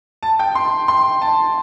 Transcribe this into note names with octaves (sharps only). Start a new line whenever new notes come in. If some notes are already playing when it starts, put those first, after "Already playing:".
A5
G5
C6
C6
A5